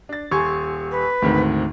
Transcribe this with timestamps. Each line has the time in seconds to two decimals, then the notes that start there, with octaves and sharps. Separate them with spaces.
0.09 D4 A6
0.31 D#1 G#5 C6 C#6 G#6
0.91 B4
1.22 D2 G#2 D#3 C4